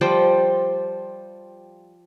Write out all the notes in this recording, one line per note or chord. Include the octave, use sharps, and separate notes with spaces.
F3 G3 C5 G5